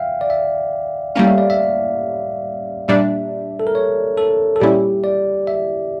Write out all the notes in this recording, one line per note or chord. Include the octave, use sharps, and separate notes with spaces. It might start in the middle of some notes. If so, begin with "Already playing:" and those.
Already playing: E5 F5 G5
D5
E5
A2 G3 A#3 C#4 F5
E5
D5
E5
A#2 G3 D4 E5
A4
A#4
C#5
A4
A4
A#2 G3 C#4 E4 G4
D5
E5